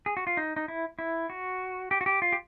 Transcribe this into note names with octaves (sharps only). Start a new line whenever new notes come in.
G#4
F#4
F4
D#4
D#4
E4
E4
F#4
G4
F#4
G4
F4
G4